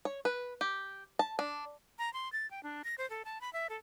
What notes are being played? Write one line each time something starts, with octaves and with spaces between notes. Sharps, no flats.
C#5
B4
G4
A5
D4
A#5
C6
A6
G5
D4
A#6
C5
A4
A5
B5
E5
A4